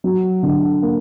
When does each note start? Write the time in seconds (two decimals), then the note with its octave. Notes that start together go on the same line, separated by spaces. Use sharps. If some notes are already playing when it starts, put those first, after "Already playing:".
0.04 F#3
0.43 D3
0.82 A#3